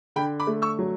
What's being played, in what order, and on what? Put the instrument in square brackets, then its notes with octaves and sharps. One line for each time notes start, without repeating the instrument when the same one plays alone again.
[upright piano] D3 [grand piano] G5 B5
[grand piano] B5 D6
[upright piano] A3
[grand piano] C#6 E6
[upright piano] F#3